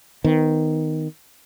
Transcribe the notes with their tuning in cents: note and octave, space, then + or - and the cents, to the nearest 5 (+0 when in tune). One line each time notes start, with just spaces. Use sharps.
D#3 +5 B3 +35